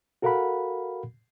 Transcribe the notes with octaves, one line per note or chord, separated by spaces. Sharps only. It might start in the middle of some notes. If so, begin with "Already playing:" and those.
F#4 A4 A#4 F5 F#5 B5